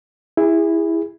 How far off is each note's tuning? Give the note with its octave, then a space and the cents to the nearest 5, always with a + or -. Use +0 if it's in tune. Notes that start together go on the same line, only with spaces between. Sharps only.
E4 +0 G#4 -30